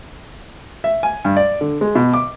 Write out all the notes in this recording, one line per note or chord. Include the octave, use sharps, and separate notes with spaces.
E5
G#5
G2
D5
D3
G#3
B2
D6